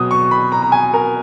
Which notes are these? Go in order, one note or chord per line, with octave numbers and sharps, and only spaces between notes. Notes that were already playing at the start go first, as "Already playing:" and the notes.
Already playing: B2 F#3 D#6
C#6
B5
A#5
A#5
G#5
A#4